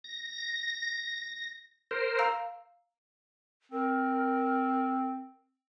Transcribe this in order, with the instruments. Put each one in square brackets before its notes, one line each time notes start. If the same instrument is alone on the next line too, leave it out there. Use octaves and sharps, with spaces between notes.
[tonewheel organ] A#6
A#4 C5
[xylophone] F5 A#5 E6
[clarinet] C4 [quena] A#4